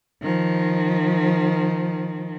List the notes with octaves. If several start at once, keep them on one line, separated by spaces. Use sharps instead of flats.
D#3 F3